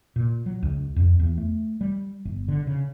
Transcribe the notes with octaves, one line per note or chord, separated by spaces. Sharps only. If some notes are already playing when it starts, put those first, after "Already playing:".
A#2
F#3
C#2
F2
E2
A3
G3
G1
D3
C#3